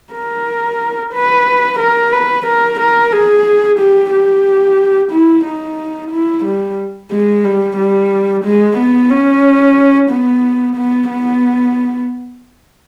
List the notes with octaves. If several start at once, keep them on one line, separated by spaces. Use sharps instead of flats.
A#4
B4
A#4
B4
A#4
A#4
G#4
G4
G4
E4
D#4
E4
G3
G#3
G3
G3
G#3
B3
C#4
B3
B3
B3